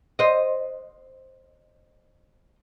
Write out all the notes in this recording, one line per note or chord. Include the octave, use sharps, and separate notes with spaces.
C5 D#5